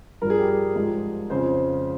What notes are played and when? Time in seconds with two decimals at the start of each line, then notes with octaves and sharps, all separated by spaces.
0.21 G2 F3 A#4
0.30 G#4
0.39 G4
0.48 G#4
0.76 G#2 F3
1.30 F2 C#3 F3 C5